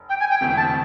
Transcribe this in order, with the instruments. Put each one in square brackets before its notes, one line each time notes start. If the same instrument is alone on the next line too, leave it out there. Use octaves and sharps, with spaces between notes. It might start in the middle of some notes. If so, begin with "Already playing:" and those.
Already playing: [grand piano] F1
[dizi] G5
G#5
G5
[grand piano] E1 D2 C3 [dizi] G5
[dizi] A5